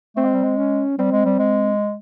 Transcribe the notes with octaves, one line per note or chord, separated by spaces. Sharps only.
A3 C4
G#3
G3
G#3
C#4
G3 C4
G#3
G3
G#3